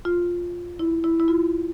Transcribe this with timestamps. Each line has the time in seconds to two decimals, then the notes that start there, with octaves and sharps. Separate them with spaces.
0.05 F4
0.79 E4
1.04 E4
1.20 E4
1.28 F4